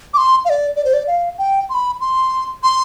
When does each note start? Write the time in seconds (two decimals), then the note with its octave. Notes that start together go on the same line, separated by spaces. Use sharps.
0.14 D6
0.18 C6
0.45 F5
0.50 D5
0.76 D5
0.85 C5
0.94 D5
1.07 F5
1.38 G5
1.70 C6
1.74 B5
2.01 C6
2.63 C6